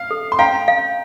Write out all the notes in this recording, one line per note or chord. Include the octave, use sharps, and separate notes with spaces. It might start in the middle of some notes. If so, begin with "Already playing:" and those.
Already playing: F5
A4
C6
F5 G5 A#5
F5